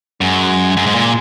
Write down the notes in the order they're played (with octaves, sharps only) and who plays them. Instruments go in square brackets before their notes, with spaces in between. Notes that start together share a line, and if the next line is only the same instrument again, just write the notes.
[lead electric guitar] F#2 [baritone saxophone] G#3
[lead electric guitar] F#2
G#2
A#2